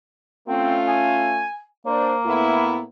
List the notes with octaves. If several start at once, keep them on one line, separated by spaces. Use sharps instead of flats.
A3 C4 C#4 F4
G#5
A#3 D4 C5
A2 B3 E4